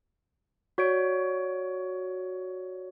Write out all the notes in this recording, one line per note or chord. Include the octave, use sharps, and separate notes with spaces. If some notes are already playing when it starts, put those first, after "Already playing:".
F#4 C#5 D5 D7